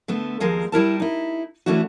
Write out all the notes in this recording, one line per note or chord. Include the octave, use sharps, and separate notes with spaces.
D3 A3 B3
D#2 F3 G#3 A#4
G3 E4 A#4 A5
D#4 E4
E3 A3 C#4 D4 E4 F#4